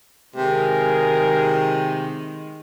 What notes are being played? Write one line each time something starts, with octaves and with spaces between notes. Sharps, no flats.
C3 D#3 G#3 G#4 A#4